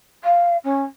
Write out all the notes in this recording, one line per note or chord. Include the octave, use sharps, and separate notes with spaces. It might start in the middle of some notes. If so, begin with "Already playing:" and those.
F5
C#4